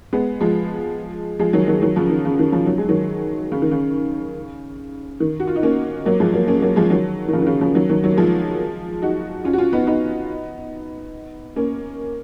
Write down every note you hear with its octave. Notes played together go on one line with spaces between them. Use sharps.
G#3 B3
F3 G#3
F3 G#3
D#3 F#3
D#3 F#3
D#3 F#3
C#3 F3
D#3
C#3
D#3
C#3 F3
F#3
G#3
D#3 F#3
C#3
D#3
C#3
D#3
F#4
F4
D#4
A#3 C#4
F#3 A#3
F3 G#3
F#3 A#3
A#3 C#4
F#3 A#3
F3 G#3
D#3 F#3
D#3
C#3 F3
D#3
C#3
C#3 F3
D#3 F#3
D#3 F#3
D#3 F#3
A#3
F3 G#3
D#4 F#4
C#4 F4
F#4
C#4 F4
B3 D#4
B3 D#4
A#3 C#4